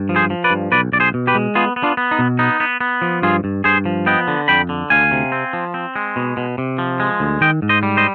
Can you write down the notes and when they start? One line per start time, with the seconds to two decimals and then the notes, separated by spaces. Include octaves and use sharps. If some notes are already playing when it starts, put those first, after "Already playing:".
Already playing: G2
0.09 F3
0.16 G#4 C5
0.30 F3
0.44 B4 D5
0.51 G2
0.72 B1 B4 D5
0.93 B1 D5
1.00 G#4 C5
1.14 B2
1.27 G4 B4
1.35 G#3
1.55 B3 F4 G#4
1.76 B3
1.83 D4 F4
1.97 B3
2.11 D#4
2.19 B2
2.39 B3 D#4
2.60 B3
2.81 B3
3.02 F3
3.22 G2 F4 G#4
3.44 G2
3.64 G2 G#4 C5
3.85 F3
4.06 B3 D#5 G5
4.28 D3
4.48 F2 G5 B5
4.69 D3
4.90 D2 F5 G#5
5.12 C3
5.32 C4
5.53 F3
5.74 C4
5.96 G#3
6.16 B2
6.37 B2
6.58 C3
6.78 F3
7.00 G#3
7.20 D2
7.41 D#3 D#5 G5
7.62 G#2
7.69 C5 D#5
7.83 G3
7.97 C5 D#5